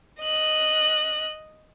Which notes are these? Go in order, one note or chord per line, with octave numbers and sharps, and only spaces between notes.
D#5 F#6